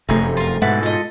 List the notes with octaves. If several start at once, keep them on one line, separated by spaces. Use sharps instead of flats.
F1 F#2 C3 A3 C4 D#4 G#4 C#5
F4 A#4
G#2 B2 G#3 A4 B4 E5 F#5
G#3 F4 A4 D#5